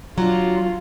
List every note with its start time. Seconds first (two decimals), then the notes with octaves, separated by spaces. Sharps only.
0.18 F#3 D4 F4